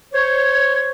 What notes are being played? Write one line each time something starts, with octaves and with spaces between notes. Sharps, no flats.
C5 C#5